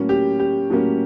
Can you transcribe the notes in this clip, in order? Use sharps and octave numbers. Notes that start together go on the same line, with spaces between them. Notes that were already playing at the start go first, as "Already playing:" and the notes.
Already playing: A2 F#3 A#3 C#4
G4
G4
A2 F#3 A#3 C#4